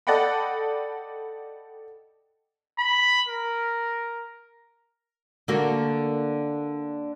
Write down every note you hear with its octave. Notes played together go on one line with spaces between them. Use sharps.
A4 D5 D#5 F#5 G5 B5
B5
A#4
D3 A#3 F#4